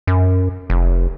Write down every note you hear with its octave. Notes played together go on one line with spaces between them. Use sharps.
F#2
F1